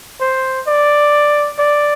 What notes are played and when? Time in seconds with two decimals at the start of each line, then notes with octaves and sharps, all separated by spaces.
0.21 C5
0.67 D5
1.59 D5